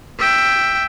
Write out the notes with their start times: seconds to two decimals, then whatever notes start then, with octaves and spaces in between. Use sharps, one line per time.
0.19 E5 G5